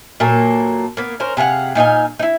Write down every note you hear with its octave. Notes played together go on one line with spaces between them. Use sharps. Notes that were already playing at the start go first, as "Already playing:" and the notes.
A#2 F#3 A#3 A4
A#3 B3
C#4 A#4 C5
C3 G#4 F5 F#5
A#2 D#4 F5 G#5
D#4 E4